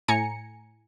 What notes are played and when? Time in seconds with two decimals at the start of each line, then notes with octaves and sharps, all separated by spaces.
0.08 A2 G#5 A#5 C#7